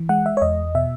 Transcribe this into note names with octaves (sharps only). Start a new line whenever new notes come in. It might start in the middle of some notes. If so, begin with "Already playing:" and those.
Already playing: E3
G#3 F#5
E5
C#5
E2 D#5
B2 E5